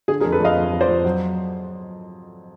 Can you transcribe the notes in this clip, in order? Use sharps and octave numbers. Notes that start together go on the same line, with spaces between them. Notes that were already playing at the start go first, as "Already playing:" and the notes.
D3 G#4
G#4 A#4
F2
A4 B4
F2 D#5 F5
F2
F3
C5 D5
F2
F#3